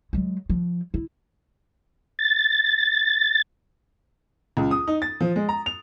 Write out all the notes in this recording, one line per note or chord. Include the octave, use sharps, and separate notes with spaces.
F#3 G#3
F3
E4
A6
C#2
D#6
D#4
A6
F3
G#3
A#5
F7